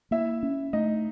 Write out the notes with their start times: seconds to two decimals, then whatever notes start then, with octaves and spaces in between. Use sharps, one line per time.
0.11 A#3 E4 E5
0.43 C#4
0.73 A3 D#4 D#5